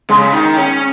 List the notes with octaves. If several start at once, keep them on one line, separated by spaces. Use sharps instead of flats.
C#3 G#3
C#3
D#3
C#4